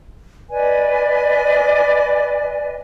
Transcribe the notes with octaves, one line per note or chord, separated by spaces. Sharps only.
B4 D5 D#5 G#5